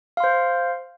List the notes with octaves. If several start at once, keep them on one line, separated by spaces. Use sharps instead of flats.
C5 F5 C6